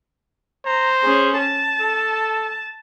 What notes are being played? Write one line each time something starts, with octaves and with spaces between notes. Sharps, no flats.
C5 A#5
C#4 G#4
A5
A4